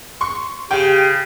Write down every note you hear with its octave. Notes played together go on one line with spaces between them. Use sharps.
C6 C#6
C#3 G4 G5